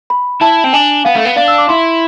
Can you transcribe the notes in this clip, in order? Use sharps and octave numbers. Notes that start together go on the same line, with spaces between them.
B5
E4 A5
C4
D4 G#5
B3 F5
A3
B3
D4 F5
E6
D6
E4 C6